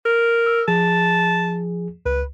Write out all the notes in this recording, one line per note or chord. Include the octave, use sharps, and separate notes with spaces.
A#4
E6
F3 G#4 A5
C#2 B4